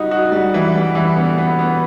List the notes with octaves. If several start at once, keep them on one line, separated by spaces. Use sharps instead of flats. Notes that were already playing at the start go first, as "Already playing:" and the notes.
Already playing: G3 D#4 F#4
F#4
G3
E3
G3
E3
B3
B3
B3